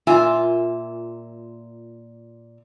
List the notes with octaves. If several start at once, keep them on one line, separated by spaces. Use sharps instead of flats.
A#2 A#3 F4 E5 G#5